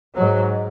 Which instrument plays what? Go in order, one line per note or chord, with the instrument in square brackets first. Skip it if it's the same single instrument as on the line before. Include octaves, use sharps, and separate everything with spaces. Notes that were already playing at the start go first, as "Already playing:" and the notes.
[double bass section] G#2 F#3